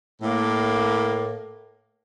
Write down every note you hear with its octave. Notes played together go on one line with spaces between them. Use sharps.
A2 A#3